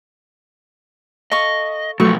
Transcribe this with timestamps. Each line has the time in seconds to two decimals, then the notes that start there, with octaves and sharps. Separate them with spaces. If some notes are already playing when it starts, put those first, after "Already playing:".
1.32 A4 D#5 F5 C#6
2.00 B2 F3 F#3 A3 C#6